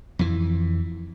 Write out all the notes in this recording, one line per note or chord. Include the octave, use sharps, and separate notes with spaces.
F2 E3